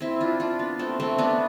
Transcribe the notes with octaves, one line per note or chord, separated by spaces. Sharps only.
C4 E4
D4 F4
D4 F4
B3
A3 C4
A3 C4
B3 D4